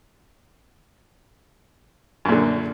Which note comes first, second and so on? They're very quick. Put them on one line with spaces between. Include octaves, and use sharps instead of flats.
F#2 A#2 D3